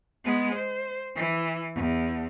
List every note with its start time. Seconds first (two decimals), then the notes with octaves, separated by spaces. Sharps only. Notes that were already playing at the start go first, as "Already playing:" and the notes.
0.24 G#3 B3
0.55 C5
1.15 E3
1.75 E2